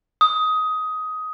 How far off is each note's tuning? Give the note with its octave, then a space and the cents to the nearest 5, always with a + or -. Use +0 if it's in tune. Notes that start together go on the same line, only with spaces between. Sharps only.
D#6 +15